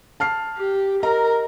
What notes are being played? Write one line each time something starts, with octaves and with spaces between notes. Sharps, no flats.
A5 F6 C7
G4
A#4 D#5 A#5